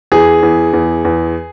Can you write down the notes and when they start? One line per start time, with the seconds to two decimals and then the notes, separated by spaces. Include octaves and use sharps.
0.12 E2 G#4
0.43 E2
0.73 E2
1.05 E2